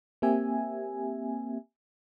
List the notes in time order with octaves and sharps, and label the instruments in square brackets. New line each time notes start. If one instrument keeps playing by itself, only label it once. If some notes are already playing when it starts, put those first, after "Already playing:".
[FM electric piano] A#3 C4 G4 E5 G#5